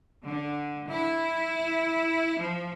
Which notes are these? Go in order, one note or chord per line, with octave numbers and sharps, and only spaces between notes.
D3
E4
F3